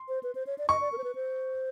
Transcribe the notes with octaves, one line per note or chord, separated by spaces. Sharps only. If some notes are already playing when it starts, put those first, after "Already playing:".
Already playing: C6
C5
B4
C5
C#5
D5
D#5 C#6
D5
A#4
C5
B4
C5